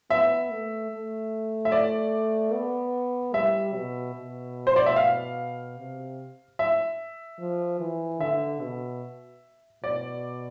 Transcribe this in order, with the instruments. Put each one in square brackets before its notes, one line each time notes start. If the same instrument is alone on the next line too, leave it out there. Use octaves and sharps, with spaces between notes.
[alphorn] B3 [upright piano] E5
[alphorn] A3
A3
[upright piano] E5
D5
[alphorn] B3
[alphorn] G3 [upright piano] E5
[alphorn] B2
B2
[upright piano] C5
D5
E5
F5
[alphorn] C3
[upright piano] E5
[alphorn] F3
E3
[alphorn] D3 [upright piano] E5
[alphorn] B2
[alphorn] B2 [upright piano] D5